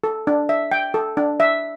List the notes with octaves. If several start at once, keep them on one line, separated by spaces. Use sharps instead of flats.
A4
D4
E5
G5
A4
D4
E5